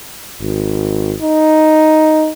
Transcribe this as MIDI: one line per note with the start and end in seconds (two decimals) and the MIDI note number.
0.41 1.14 32
1.22 2.30 63